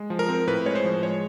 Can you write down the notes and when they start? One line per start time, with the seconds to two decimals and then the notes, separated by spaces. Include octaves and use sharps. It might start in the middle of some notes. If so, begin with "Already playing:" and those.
Already playing: G#3
0.10 F3
0.19 A#4
0.29 C4
0.47 A2 B4
0.66 G#3 C#5
0.75 C5
0.84 F3
1.03 G#3 C#5